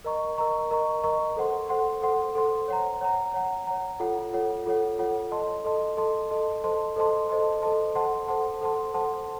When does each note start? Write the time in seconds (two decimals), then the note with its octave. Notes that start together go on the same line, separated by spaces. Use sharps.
0.04 A#4 D#5 A#5 C#6
0.38 A#4 D#5 A#5 C#6
0.71 A#4 D#5 A#5 C#6
1.03 A#4 D#5 A#5 C#6
1.36 A4 C5 F#5 C6
1.69 A4 C5 F#5 C6
2.02 A4 C5 F#5 C6
2.35 A4 C5 F#5 C6
2.68 C#5 F#5 A#5
3.01 C#5 F#5 A#5
3.34 C#5 F#5 A#5
3.67 C#5 F#5 A#5
4.00 F4 A4 C#5 F#5
4.33 F4 A4 C#5 F#5
4.66 F4 A4 C#5 F#5
4.99 F4 A4 C#5 F#5
5.31 A4 D#5 A5 C6
5.65 A4 D#5 A5 C6
5.97 A4 D#5 A5 C6
6.30 A4 D#5 A5 C6
6.64 A4 C5 D#5 A5 C6
6.96 A4 C5 D#5 A5 C6
7.29 A4 C5 D#5 A5 C6
7.62 A4 C5 D#5 A5 C6
7.95 A4 C5 F#5 A5 C6
8.28 A4 C5 F#5 A5 C6
8.61 A4 C5 F#5 A5 C6
8.94 A4 C5 F#5 A5 C6